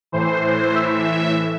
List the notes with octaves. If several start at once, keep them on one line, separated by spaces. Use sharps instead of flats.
A2 E3 C5
C5
E5